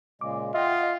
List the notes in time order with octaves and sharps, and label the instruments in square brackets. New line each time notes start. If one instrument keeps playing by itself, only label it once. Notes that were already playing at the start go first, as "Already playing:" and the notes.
[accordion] A#2 C#3 G#3 [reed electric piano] D6
[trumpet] F4 [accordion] D#5 [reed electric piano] E5 F#5 G5